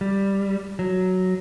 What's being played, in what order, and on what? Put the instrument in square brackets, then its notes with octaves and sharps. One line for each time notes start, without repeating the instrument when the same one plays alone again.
[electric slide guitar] G3
F#3